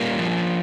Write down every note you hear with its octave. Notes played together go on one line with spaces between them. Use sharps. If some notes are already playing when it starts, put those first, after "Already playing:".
Already playing: G3 A#3 C#4 F4
F3